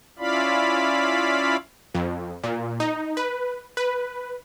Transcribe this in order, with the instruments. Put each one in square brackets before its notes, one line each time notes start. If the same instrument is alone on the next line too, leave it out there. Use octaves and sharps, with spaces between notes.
[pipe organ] C#4 E4 F4 D5 F5 B5
[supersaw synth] F2
A#2
D#4
B4
B4